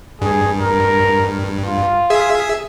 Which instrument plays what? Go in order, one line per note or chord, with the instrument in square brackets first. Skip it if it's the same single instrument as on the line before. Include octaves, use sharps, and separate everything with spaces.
[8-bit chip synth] G2 [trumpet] G#4
[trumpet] A#4
F4
[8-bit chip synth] G#4 E5